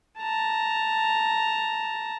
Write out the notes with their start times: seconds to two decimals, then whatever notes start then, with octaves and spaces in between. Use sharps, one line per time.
0.19 A5 A#5